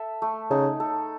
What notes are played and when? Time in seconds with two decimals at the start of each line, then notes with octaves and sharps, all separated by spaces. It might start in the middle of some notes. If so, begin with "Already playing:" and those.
Already playing: A4 E5
0.22 A3
0.51 C#3 D#4
0.80 A4